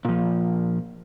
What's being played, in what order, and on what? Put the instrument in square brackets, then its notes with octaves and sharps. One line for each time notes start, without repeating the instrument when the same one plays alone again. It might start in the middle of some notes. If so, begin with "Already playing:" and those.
[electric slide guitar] A#2 F3